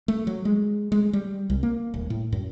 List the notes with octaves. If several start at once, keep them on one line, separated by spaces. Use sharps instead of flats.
A3
F#3
G#3
G#3
G3
C2
A#3
D#1
A2
F#2